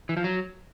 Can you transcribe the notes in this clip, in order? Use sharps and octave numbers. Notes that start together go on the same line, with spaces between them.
E3
F3
F#3